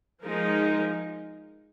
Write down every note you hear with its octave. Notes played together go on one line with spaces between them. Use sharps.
F3 G#3 D#4 A#4